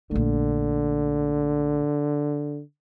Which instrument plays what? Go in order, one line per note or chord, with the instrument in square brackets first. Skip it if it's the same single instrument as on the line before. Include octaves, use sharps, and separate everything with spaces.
[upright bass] A#1 A3 [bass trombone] D3